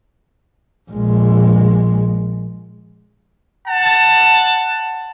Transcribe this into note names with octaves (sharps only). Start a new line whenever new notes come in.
A#1 G#3
F#5 A5